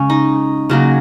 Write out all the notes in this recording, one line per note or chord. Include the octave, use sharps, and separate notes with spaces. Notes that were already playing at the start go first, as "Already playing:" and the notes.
Already playing: C#3 G#3 C#4
D#4
C#3 F#3 A#3